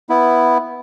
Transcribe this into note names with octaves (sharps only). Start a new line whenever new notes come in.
B3 E4